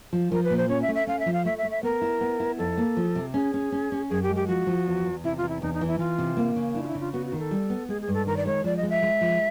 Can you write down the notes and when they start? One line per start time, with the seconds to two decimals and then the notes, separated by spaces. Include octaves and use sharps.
0.13 F3
0.31 F3 A#4
0.44 B4
0.50 A#2
0.57 C5
0.69 C#4 C#5
0.82 E5
0.88 A3
0.95 E5
1.07 C#4 F5
1.20 E5
1.26 F3
1.33 F5
1.45 A3 E5
1.58 E5
1.65 A3
1.71 E5
1.83 B3 A#4
2.01 E4
2.21 B3
2.40 E4
2.58 F2 A4
2.77 A#3
2.97 F3
3.15 C3
3.34 C#4 G#4
3.54 C#4
3.72 C#4
3.92 C#4
4.10 F#2 G#4
4.23 G4
4.29 G#3
4.36 G4
4.47 F3 F#4
4.67 F3
4.86 E2
5.05 E2
5.24 C3 E4
5.37 F4
5.42 E2
5.49 E4
5.62 E2 D#4
5.74 D#4
5.81 E3
5.87 E4
5.99 E3 F4
6.18 C3
6.37 A#3
6.56 C#3
6.75 D4 E4
6.83 F4
6.88 E4
6.95 C#3
7.00 F4
7.13 B3 F#4
7.26 F#4
7.32 D#3
7.39 A4
7.51 G3
7.70 B3
7.89 G#3 G#4
8.01 G#4
8.08 G2
8.14 A4
8.27 D#3 A#4
8.37 D5
8.46 G#3 C#5
8.64 F3 D5
8.77 D#5
8.83 G#3
8.90 E5
9.02 G#3
9.21 F3